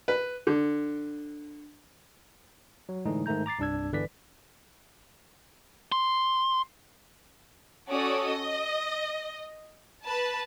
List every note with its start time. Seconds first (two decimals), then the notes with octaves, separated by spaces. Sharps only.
0.08 B4
0.47 D3
2.89 F#3
3.06 A2 D3 E3 G#3 D#4
3.26 G#2 D#3 A3 A#5 G6
3.46 A#5 D6 A6 C7
3.59 C2 G2 D4 E6 G#6
3.92 G1 D3 E3 B4 D5 B6
5.92 C6
7.91 C#4 F#4 A4 D5 D#6
8.28 D#5
10.05 B4 A5